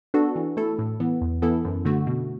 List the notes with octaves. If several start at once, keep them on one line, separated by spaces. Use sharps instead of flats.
B3 D4 F#4 A4
E3
A3 E4 A4
A2
E3 B3
E2
E3 B3 E4 A4
F#2
D3 A3 F#4
B2